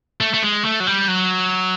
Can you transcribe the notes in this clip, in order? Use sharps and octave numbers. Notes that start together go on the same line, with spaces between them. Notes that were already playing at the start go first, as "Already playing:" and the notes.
A3
A3
G#3
A3
F#3
G3
F#3